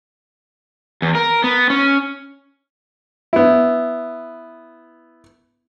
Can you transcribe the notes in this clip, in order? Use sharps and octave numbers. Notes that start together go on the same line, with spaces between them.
E2
A#4
B3
C#4
B3 E4